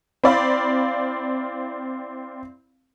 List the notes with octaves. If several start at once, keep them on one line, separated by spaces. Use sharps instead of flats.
C4 E4 D5 F5 B5